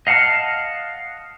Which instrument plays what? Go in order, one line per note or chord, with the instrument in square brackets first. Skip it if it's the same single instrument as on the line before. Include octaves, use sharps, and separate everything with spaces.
[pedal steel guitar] D#5 F5 F#5 A5 F6